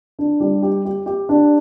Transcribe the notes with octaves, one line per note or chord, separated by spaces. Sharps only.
D4
G3
G4
G4
G4
D4